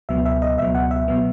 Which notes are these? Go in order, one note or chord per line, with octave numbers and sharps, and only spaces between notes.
C#2 B2 F#3 B3 E5
E5
D#5
C#2 B2 F#3 B3 E5
F#5
E5
B2 F#3 B3